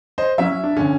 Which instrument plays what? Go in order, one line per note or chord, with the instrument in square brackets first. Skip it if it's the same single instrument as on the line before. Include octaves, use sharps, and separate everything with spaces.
[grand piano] C5 D#5
[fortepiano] F#3 C#4 E4 [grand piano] E5
[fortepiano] D4
[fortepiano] D2 D3 [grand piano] C#4